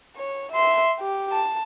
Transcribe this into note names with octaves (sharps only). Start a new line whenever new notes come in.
C#5
E5 C6
G4
A5